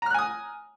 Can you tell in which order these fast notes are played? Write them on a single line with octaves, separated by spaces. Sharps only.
A#5 F6 F#6 G#5 D#6